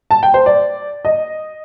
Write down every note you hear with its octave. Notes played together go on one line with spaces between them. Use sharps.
A5
G5
C5
D5
D#5